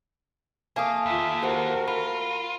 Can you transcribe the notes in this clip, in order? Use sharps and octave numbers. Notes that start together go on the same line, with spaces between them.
A3 A#3 F5 G#5 D#6
D#2 F4 E5
F#4 G4 A#4 C5 F#5
F4 B5